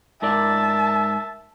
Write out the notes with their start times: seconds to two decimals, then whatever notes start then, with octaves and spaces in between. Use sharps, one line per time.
0.22 G#2 A#4 D5 E5 A5